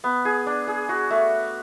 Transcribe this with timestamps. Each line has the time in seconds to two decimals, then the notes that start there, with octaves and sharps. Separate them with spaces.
0.04 B3
0.25 G#4
0.46 D4
0.67 G#4
0.89 F#4
1.10 A3